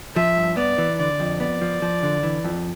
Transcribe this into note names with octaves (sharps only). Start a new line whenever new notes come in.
F3 E5
G2
B3 D5
E3
D3 D5
F2
B3 D5
F3
F3
D3
E3
F2